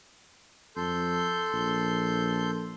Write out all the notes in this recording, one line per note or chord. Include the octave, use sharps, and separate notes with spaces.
F2 A4 C6 G6
A#1